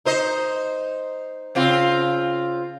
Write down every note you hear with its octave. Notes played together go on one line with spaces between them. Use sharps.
D#4 C5 D#5
C#3 C4 F4